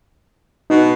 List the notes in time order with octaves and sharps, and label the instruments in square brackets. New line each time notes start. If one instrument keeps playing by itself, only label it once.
[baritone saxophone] B2 [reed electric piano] D#4